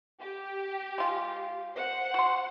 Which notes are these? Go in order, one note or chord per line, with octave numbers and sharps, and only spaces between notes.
G4
G#3 F4
C5 F#5
F#4 C6